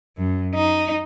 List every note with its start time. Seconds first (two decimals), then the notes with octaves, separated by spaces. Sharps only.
0.17 F#2
0.55 D#4